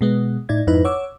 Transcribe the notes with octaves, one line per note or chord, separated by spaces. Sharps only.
B2 G#3 B3
A2 D#4 D5 G#6
F2 G#2 D#4 E4 B4
C#5 F#5 D6 E6